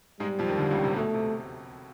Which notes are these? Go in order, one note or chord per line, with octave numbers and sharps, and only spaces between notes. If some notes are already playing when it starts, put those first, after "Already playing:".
G#2 G3 G#3
F2 F3
D#2 D#3
D2 D3
C#2 C#3
C3
B2 A3
C3